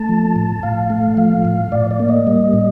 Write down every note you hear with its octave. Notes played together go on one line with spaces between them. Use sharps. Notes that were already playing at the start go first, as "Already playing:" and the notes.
Already playing: A3 A5
F3
A2
A2 F5
A3
F3 F5
A2
A2 D5
D5
A#3
D#5
G3
A2